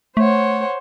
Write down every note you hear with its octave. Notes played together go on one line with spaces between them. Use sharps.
A3 C5 C#5 F#5